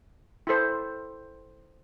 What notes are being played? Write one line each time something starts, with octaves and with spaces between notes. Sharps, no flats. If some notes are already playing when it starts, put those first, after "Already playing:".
E4 A4 C5